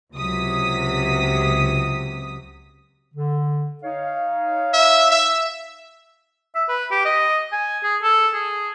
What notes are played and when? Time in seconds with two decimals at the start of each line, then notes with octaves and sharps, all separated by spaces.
0.13 C#2 C3 F#3 D#6 B6
3.14 D3
3.83 D#4 C#5 F5
4.74 E5
5.11 E5
6.55 E5
6.69 B4
6.91 G4
7.05 D#5
7.52 G#5
7.84 G#4
8.03 A4
8.34 G#4